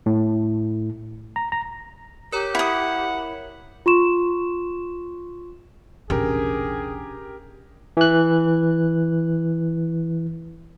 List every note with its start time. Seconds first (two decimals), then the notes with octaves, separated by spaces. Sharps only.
0.06 A2
1.36 A#5
1.52 A#5
2.32 G4 A#4 C#5 A#5
2.55 E4 F#5 D#6
3.86 F4 C6 C#6 E7
6.10 D#1 A1 C3 C#4 D4 G4 G#4 A#4
7.97 E3 F#6